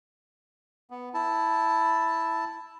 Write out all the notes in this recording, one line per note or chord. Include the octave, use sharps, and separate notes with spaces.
B3
E4 A5